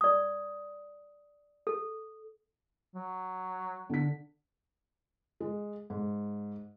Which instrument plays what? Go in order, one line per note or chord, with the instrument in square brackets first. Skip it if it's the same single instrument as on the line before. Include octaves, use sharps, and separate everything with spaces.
[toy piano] D5 D#6
A4
[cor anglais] F#3
[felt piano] D3 B6
G#3
G#2